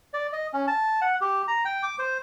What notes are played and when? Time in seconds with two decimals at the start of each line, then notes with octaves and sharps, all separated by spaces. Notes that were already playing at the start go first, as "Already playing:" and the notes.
0.14 D5
0.33 D#5
0.53 C#4
0.67 A5
1.02 F#5
1.21 G4
1.48 A#5
1.65 G5
1.83 D6
1.99 C5